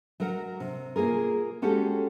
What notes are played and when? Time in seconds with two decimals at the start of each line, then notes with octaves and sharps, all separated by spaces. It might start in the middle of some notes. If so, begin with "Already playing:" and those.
0.20 F#3 A#4 F#5
0.60 C3
0.96 A#3 F4 G#4 A#4
1.62 G#3 C#4 F#4 G4 A4